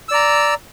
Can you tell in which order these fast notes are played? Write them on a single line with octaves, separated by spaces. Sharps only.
E6 D5 A#5